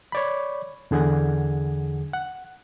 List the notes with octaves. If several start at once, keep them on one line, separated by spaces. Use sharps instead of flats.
C#5 D5 B5
E2 D3 G#4 F#5 G#5
F#5